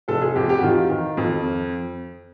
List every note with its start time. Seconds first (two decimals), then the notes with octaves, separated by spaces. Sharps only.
0.08 F1 A4
0.22 G#4
0.35 F2 G4
0.49 G4
0.57 F#4
0.63 D#3 F4
0.90 D#3
1.17 F2